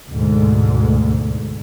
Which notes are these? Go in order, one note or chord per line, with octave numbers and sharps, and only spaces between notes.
D2 G#2 B2